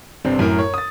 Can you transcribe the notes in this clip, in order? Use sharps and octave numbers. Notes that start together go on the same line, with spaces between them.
G1 C3 C4 D4
F#2 A2 A#4
C#5
D#6 A6